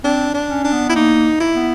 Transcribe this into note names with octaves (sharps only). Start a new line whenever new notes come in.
C4 D4
D4
C#4
D4
B3
E4
A#3 D#4
E4
B3